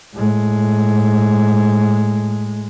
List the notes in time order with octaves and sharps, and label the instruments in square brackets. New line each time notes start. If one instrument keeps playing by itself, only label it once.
[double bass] A2 G#3